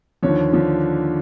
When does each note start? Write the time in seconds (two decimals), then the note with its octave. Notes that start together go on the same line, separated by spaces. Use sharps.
0.22 D#2 D3 F3 C#5
0.53 D3 F3